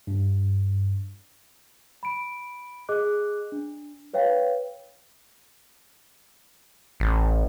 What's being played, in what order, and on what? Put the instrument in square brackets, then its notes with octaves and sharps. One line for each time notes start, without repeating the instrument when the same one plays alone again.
[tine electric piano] G2
[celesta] B5 D7
G#4 D#5 D6 F#6
D4
B4 C#5 F5 G5
[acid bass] A1